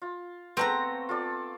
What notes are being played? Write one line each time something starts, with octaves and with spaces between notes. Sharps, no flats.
F4
A3 B3 C4 B4 G5 A#5
F4 A4 D5